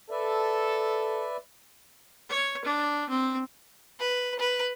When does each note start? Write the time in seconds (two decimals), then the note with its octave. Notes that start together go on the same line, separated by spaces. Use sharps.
0.11 A4 B4 D5 E5
2.29 C#5
2.64 D4
3.09 C4
3.99 B4
4.39 B4